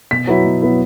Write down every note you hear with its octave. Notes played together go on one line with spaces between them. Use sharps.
B2 B6
F#3 B3 E4
B2
F#3 B3 E4